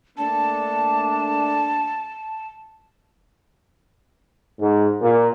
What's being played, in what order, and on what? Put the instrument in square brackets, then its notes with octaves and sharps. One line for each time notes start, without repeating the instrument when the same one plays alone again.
[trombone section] A3 A#3 D4 [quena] A5
[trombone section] G#2
A#2